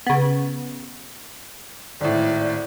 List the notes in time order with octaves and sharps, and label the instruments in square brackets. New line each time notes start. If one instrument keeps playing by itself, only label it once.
[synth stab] C#3 B3
[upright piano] G#1 A2 [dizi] D5